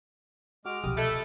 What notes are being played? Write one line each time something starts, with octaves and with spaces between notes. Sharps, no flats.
G#3 F#4 D6 F6
C2 B2 F3 G4 D#6
A3 D#5 B5 G#6 A6